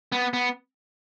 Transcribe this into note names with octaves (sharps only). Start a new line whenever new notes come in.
B3
B3